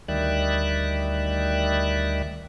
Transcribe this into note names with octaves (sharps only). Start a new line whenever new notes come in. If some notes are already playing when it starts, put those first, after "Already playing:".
D2 D#3 G3 D5 E5 F#6